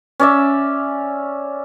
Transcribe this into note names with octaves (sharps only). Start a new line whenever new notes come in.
C#4 D5 E5